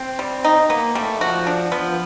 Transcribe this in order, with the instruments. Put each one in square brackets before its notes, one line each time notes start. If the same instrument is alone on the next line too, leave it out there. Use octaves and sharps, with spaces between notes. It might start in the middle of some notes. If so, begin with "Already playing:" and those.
Already playing: [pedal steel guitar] C4
[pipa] G3
D#4
[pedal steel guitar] A#3 [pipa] B3
[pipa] G3 [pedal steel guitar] A3
[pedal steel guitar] F3 [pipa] F#4
[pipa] D4
[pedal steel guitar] F3 [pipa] B3